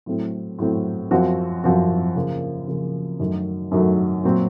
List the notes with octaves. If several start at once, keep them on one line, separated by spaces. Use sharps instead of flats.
A2 F#3 A3 C4
A2 F#3 A3 C4
F#2 F3 C4 F#4
F#2 F3 C4 F#4
C#3 F3 A#3
C#3 F3 A#3
F#2 D#3 F#3 A3
F#2 D#3 F#3 A3
A#2 F#3 C4 F#4